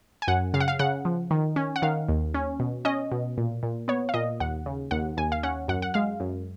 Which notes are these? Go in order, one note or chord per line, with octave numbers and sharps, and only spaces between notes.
G#5
F#2 F#5
C#3 F5
F#5
F5
C#3 F#5
F3
D#3
C#4
F#5
D#3 F5
D#2
C#4
B2
C#4 D#5
B2
A#2
A#2
B3 C#5
F5
A#2 D#5
D#2 F#5
C#3
D#2 F#5
D#2 G#5
F5
C#4 F#5
F#2 F#5
F#5
G#3 F5
F#2